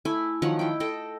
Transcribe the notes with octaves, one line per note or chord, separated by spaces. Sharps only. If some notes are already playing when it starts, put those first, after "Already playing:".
A3 E4 G#5
D#3 F3 F#3 F#5
E4 G5
A4 D#5 G5